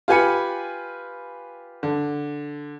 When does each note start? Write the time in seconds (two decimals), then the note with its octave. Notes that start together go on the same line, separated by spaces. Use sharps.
0.08 F4 G4 B4 G#5 B5 C#7
1.83 D3